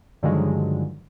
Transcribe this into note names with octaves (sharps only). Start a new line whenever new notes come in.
G2 D3 D#3 F3 F#3 G#3